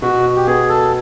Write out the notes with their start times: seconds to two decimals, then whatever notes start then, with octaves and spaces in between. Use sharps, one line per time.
0.02 B2 F#4
0.36 G4
0.47 B3 G#4
0.69 A4